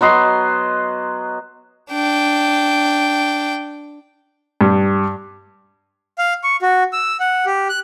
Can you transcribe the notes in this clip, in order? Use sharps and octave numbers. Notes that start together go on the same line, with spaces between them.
F#3 B3 D#5 C6
D4 G5
G2
F5
C#6
F#4
E6
F#5
G4
F#6